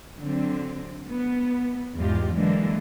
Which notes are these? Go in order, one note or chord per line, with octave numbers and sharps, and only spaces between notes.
D3 F#3 C4
B3
E2 G#2 G#3 F4 G4
D3 E3 F#3 G#3 A#3 D4